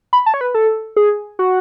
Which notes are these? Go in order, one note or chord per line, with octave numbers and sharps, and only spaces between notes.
B5
A5
C#5
B4
A4
G#4
F#4